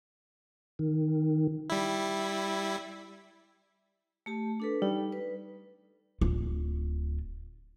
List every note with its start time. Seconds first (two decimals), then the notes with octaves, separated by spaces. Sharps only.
0.79 D#3
1.70 G3 E4
4.26 A3 G4 A5
4.60 D4 A4 B4
4.82 G3 D#4
5.12 B4
6.21 D1 F4